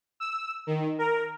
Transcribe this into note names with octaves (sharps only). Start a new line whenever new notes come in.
E6
D#3
A#4